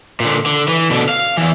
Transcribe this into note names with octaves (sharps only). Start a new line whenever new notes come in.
A#2 D3
D3
E3
B2 D3
F5
E2 E3